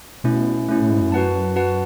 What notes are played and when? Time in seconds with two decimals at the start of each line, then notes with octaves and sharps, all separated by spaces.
0.24 B2 A3 C#4 E4
0.68 B2 A3 C#4 E4
0.80 A2
0.90 G#2
1.01 F#2
1.12 F#4 B4 F#5 A5
1.56 F#4 B4 F#5 A5